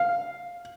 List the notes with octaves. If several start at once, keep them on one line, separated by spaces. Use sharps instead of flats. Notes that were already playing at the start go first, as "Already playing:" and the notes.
Already playing: F5